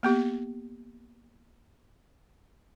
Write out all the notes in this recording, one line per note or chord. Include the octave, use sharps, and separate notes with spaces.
A#3 B3 G4